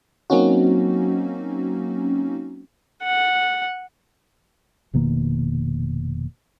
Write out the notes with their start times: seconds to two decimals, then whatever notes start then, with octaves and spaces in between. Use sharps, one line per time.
0.30 F#3 A#3 C4 C#4 D#4 F#4
3.03 F#5
4.93 F1 B2 D#3 A#3